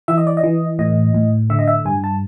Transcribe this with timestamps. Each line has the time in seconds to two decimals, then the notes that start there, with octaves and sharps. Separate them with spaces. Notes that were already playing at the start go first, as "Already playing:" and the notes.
0.08 E3 E5
0.18 D#5
0.27 D5
0.37 D#5
0.43 E3
0.79 A2 D#5
1.14 A2
1.50 D3 E5
1.59 D#5
1.67 E5
1.85 G2 G#5
2.04 A5